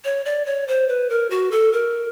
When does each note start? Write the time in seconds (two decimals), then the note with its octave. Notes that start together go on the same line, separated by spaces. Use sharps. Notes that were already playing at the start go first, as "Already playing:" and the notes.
0.04 C#5
0.25 D5
0.46 C#5
0.68 C5
0.88 B4
1.10 A#4
1.30 F#4
1.51 A4
1.73 A#4